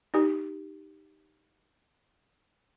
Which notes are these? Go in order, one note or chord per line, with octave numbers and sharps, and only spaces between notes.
D#4 G4